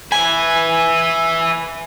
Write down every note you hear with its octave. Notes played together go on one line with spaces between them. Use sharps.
B4 E5 G#5